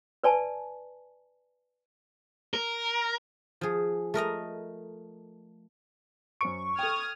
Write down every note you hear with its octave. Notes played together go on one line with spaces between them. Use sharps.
B4 D5 G#5 A5
A#4
F3 G#4
A3 A#4 D#5 A#5
F#2 C5 C#6 D7
A4 G5 D#6 F6 G#6